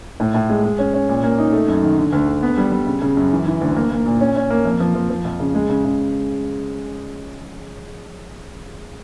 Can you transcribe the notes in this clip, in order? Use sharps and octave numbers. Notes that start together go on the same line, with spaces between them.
A2
A2
G#3
G#3
C#4
C#4
A#2
A#3
D#4
A3
F#2
D#3
D3
D2
D3
B3
G3
G3
C#3
C#3
F#2
E3
E3
D2
A#3
A#3
A#2
C#4
C#4
A#3
F2
F3
F3
F3
F2
C#3
G#3
C#3
C#3